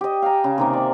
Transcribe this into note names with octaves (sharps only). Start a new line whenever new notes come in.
G4 D#5
F5 G5 G#5 A#5
C#3
C3 D#3 A#3
D5 E5